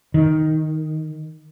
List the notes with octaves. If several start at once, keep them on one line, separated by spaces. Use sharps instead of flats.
D#3